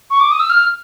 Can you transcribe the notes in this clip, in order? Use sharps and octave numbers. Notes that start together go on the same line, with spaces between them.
C#6
D6
D#6
E6
F6